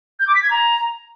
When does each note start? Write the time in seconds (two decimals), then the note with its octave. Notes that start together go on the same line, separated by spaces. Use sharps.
0.20 G6
0.27 D6
0.35 B6
0.43 G#6
0.50 A#5